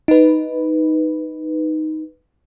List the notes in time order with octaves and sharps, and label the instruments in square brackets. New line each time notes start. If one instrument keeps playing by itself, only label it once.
[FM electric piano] D#4 B4